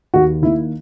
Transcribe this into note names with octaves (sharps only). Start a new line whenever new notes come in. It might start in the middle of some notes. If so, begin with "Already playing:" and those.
D#2 F#4
D#3 A#3 E4